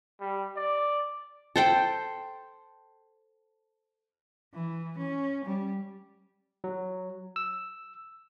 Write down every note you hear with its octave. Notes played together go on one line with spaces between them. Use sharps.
G3
D5
A4 C5 G5
E3
C#4
G3
F#3
E6